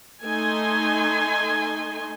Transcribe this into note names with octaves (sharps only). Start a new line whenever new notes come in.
A3 D#4 G#5 C6